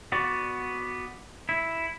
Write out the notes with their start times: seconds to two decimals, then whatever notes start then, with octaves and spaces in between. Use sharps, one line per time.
0.12 B3 F#4 D5
1.49 E4